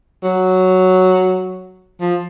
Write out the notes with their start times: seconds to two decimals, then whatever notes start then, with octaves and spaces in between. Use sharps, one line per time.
0.23 F#3
2.01 F3